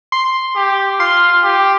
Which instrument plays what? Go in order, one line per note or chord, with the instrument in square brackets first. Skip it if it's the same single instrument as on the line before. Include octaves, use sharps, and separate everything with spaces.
[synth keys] C6
[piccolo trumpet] G4
[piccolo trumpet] F4 [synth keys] C6
[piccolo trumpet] G4